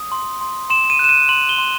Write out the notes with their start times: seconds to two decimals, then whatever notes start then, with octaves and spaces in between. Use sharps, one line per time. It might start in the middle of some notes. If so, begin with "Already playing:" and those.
Already playing: D#6
0.12 C6
0.41 C6
0.70 C6 E7
0.90 D#7
0.99 F#6 E7
1.09 D#7
1.29 C6 F#7
1.49 G7
1.58 C6